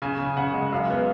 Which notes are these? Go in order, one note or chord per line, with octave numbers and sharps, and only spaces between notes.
C#3 G#5
C#3
C#3 F#5
G#3
F#2 F5
B3